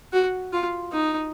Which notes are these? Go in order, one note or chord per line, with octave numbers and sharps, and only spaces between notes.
F#4
F4
D#4